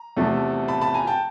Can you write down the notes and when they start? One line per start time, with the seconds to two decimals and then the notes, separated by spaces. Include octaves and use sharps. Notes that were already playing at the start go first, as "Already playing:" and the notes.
Already playing: A#5
0.17 E2 C3 F3 A3
0.68 A5 B5
0.81 A5 B5
0.94 G#5 A#5
1.07 G5 A5